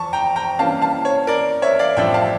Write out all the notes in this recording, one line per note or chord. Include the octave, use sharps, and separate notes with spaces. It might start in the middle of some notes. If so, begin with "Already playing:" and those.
Already playing: E2 F3 A5 C#6
G5 A#5
G5 A#5
G2 E3 A#3 C#4 F5 A5
F5 A5
C#5
A#4 D5
C#5 E5
D5 F5
A1 G2 F3 A3 D4 E5 G5
F5 A5